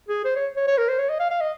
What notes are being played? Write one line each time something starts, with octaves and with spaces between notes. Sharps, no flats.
G#4
C5
C#5
C#5
C#5
A#4
C5
C#5
D#5
F5
F5
D#5